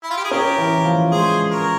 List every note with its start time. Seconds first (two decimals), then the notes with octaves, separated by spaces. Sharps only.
0.03 E4
0.10 F4
0.17 G4
0.24 G#4
0.31 C#4 G4 A#4
0.58 E3
0.85 F3
1.12 G#3 G#4 C5
1.52 A#4 C#5